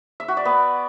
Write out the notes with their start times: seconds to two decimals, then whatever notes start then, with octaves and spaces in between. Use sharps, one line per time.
0.20 E5
0.28 F#4
0.37 D5
0.45 B3